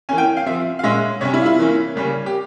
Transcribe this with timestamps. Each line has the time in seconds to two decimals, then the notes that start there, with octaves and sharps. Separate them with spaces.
0.09 E3 A#3 C#4 G#5
0.18 G5
0.37 F5
0.46 F3 C4 E5
0.79 F5
0.83 A#2 G#3 C#4 E5
1.21 C3 G3 C#4 C#5
1.34 E4
1.42 F4
1.46 E4
1.59 E3 A#3 C#4
1.96 C#3 G3 A#3 C#4
2.26 G4